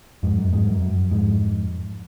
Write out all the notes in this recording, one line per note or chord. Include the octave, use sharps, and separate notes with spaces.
F2 G#2
F#2
F2 G#2
F#2
F#2
F2 G#2